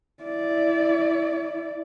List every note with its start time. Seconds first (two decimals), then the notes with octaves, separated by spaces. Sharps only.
0.24 E4 D5